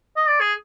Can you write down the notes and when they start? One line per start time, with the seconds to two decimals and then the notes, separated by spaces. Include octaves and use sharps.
0.16 D#5
0.29 D5
0.41 G#4